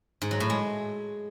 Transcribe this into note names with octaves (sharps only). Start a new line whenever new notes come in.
G#2
F#3
A2
G#3